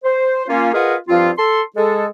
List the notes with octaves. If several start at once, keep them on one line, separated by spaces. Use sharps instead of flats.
C5
A#3 C#4 F4
F4 G#4 A#4 B4 D#5 F#5
G2 F3 C4 F4
A4 C6
G#3 G#4 A4